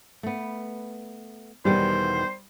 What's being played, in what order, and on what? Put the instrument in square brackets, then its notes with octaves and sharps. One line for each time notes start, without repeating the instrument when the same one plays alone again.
[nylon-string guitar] A3 B3
[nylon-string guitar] E2 B2 D#3 [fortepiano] G3 [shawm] C5